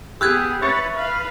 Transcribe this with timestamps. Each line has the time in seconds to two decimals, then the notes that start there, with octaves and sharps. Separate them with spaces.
0.21 B3 G4 G#4 E6 F#6 G#6
0.62 B4 C#5 E5 C#6 A6 C#7
0.95 B4 F5